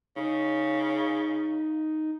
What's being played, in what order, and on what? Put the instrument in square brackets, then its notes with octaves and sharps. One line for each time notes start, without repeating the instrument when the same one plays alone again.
[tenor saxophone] C#3 [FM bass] D#4